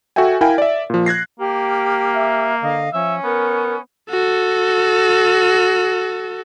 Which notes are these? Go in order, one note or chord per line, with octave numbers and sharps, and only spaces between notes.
F#4 A4 E5 G5 G#5
E4 A#4 F5 G5 G#5
D5 E5
A#2 F3
F#6 G#6 A#6 C7
A#3 G4 F6
E5
D3 D#5 F5
F3 C#4 E5
B3 A#4
F#4 A4